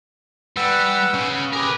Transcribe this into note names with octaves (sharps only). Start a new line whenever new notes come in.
G3 B4 F#5 E6
C#3
G4 G#4 A#4 B4